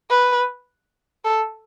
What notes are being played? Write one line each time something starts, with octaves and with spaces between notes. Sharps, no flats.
B4
A4